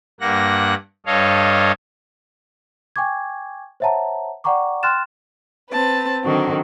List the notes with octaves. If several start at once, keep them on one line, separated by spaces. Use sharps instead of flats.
G2 A#3 F#5 A#6
G2 A4 C#5 D#5 F5
G5 G#5 C#6 D6 G#6
C5 C#5 E5 F#5 A5 A#5
D5 F#5 G5 A#5 C#6 D6
G5 C6 F6 F#6 A6 E7
C4 B4 A5
D3 D#3 F#3 C4 F#4